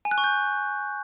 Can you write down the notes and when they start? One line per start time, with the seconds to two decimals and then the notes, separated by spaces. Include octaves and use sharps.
0.05 G#5
0.11 F#6
0.18 C#6
0.24 G6